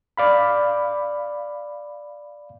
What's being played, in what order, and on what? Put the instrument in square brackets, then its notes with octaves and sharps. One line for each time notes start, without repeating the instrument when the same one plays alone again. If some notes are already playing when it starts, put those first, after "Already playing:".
[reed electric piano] D5 F5 B5